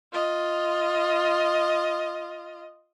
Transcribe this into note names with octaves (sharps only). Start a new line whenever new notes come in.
F4 D#5